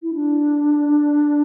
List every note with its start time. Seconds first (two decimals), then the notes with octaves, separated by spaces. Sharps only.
0.03 E4
0.14 D4